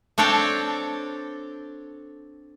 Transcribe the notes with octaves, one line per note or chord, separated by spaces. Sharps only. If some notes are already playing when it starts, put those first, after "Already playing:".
C4 D4 A4 C#5 G5 A5